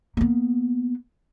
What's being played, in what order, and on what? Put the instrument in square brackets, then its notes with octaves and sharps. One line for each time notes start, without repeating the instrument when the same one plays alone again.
[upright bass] A#3 B3